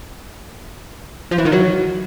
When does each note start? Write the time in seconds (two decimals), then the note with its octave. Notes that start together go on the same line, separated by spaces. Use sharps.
1.31 F3
1.38 E3
1.45 D#3
1.52 F#3